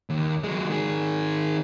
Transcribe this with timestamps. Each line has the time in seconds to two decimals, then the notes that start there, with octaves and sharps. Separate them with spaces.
0.10 D#2
0.44 F#3 G#3
0.70 D#3 G#4